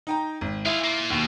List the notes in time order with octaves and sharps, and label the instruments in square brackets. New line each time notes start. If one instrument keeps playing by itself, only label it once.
[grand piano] D#4 G5 A#5
G#1
[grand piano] E4 [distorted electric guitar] F4 G#4
[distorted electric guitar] A#3 F4
[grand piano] D#2 [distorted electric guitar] B2